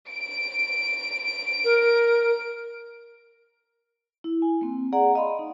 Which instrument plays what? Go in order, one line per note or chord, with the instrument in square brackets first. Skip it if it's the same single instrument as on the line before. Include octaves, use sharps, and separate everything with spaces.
[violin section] D7
[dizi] A#4
[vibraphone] E4
G#5
A#3 C4
G#4 D5 F#5 A#5
D#5 F5 B5 C6
D#4